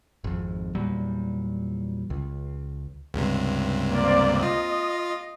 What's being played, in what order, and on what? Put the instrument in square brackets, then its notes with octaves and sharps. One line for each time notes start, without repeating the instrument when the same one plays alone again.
[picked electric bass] G#1 F2
E2 A#2 F#3 G3
C#2
[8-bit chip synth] C#2 G2 C3
[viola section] A#3 C4 D5
[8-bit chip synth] F4 [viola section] D#5